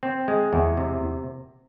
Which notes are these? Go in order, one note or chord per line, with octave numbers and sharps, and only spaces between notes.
C4
G#3
E2
C3